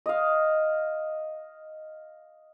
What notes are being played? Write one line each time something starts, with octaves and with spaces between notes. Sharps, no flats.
D#5 F5